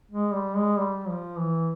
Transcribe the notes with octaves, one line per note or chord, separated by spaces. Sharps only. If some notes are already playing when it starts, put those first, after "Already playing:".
G#3
G3
G#3
G3
F3
E3